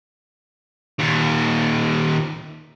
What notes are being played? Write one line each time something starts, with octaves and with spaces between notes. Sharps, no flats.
D#2 A#2